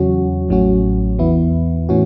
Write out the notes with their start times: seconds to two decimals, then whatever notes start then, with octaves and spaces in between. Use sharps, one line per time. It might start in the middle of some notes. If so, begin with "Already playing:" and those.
Already playing: E2 C#3 F#3 C#4 F#4
0.49 A1 A2 F#3 C#4 F#4
1.19 E2 E3 B3 E4
1.89 A2 E3 C#4 F#4